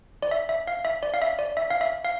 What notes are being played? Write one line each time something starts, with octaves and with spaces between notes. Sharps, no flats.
D5
E5
E5
F5
E5
D5
F5
E5
D5
E5
F5
E5
F5